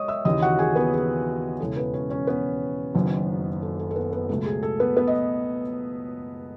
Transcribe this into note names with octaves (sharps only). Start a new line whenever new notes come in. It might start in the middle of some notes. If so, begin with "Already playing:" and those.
Already playing: G#3 C#5 D#5 C#6 D#6
E5 E6
D#2 C#3 E3 D#5 D#6
F#4 F#5
G#4 G#5
B3 B4
G#4
E1 E2 C#3 E3 A4
B3 B4
C#4 C#5
C#4 C#5
B3 B4
F#1 F#2 D#3 F#3
A4
A4
A4
B3 B4
B3 B4
C#2 B2 F#3 A3 A4
G#4
A4
B3 B4
B3 B4
D#5